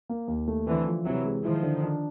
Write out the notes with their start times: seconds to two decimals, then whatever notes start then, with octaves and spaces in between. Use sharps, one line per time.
0.09 A#3
0.28 D#2
0.48 A3
0.66 D3 E3 C4
0.87 F3
1.05 C3 E3 F#3
1.25 G#3
1.44 D#3 F3 E4
1.63 D3
1.84 D4